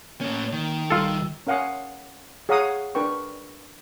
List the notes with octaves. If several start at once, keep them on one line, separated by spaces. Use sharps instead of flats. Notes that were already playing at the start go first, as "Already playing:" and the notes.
A2 A#3 C#4
D#3
G#1 G3 F4 A4 E6
C#4 A#4 F5 F#5 G#5 D#6
G#4 C#5 F5 F#5 A#5 D#6
D4 A#4 B4 G5 C#6